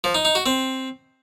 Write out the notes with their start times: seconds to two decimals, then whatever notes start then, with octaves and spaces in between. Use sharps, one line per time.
0.04 F3
0.15 D#4
0.25 D#4
0.35 F#4
0.46 C4